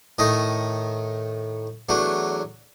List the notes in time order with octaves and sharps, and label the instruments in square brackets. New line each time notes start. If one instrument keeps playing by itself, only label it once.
[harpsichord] A2 D#3 A3 D#5 D#6
E2 F#3 A3 D4